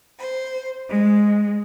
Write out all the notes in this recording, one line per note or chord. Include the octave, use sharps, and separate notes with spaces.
C5
G#3